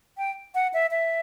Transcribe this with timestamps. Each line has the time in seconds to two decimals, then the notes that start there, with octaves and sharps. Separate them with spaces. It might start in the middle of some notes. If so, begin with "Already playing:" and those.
0.18 G5
0.55 F#5
0.74 E5
0.91 E5